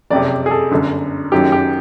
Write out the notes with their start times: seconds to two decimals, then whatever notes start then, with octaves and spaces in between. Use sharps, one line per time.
0.10 F#1 F2 C3 D5
0.46 G#4
0.51 A4
0.71 G1 F#2 D3
1.32 F#1 F#2 D#3 F#3 G4
1.52 G4